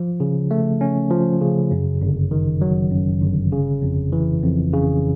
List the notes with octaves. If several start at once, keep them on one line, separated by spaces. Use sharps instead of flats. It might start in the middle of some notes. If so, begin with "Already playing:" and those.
Already playing: F3
C#3
A3
C#4
F3
C#3
F#2
G1
D#3
F#3
F#2
G1
C#3
F2
E3
F2
C#3